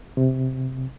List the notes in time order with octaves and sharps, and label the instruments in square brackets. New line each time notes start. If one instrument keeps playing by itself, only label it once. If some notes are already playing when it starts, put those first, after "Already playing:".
[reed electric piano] C3